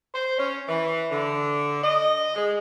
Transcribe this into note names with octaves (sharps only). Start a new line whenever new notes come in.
C5
C#4
E3
D3
D#5
G#3